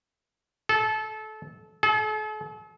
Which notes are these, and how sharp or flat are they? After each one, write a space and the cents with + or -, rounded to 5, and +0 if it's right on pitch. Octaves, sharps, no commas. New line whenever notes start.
A4 -25
A4 -45